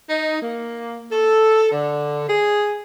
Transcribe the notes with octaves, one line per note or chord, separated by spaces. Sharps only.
D#4
A#3
A4
D3
G#4